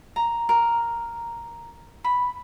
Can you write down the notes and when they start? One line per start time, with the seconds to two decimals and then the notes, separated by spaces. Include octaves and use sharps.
0.16 A#5
0.49 A#4
2.04 B5